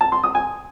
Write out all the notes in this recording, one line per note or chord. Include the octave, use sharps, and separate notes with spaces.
A5
C6
D#6
G#5